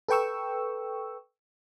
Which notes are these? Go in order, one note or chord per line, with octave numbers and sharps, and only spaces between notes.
A4 B4 G5 C#6 E6